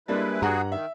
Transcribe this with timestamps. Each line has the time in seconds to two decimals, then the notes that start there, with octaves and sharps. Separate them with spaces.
0.08 G3 G#3 A#3 D4 E4 B4
0.42 G2 F#4 G#4 F#5 A#5
0.72 D#3 E5